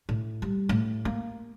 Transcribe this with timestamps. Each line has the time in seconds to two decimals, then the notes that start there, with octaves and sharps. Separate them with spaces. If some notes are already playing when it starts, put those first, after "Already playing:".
0.09 A2
0.42 G3
0.69 A2
1.05 A#3